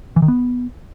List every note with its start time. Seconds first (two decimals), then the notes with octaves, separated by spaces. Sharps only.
0.16 E3
0.22 D#3
0.28 B3